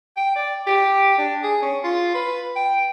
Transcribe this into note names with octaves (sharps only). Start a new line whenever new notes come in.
G5
D5
G4
D4
G#4
C#4
F4
B4
G5